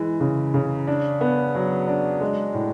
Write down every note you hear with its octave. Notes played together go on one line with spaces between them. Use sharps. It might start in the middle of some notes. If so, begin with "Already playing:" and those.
Already playing: E3 G#3
C#3
C#3
D4
B3
F#3
D4
G#3
A2